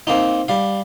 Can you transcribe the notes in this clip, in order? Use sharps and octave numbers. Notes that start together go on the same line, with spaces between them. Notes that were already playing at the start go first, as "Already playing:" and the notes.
A#3 C4 D#4
G3 F5